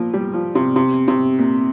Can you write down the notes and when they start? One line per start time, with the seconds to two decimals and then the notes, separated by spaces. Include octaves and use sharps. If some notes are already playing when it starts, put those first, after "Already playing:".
Already playing: A#2 F3
0.14 G3
0.34 F3
0.55 C3
0.76 C3
1.08 C3
1.38 A#2